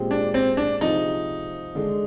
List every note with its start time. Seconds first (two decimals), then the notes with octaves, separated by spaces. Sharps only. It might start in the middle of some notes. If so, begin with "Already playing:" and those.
Already playing: A#2 G#3 C4 G4
0.11 D4
0.34 C4
0.57 D4
0.81 C3 F3 C4 D#4 F4 G#4
1.75 D3 G#3 D4 G#4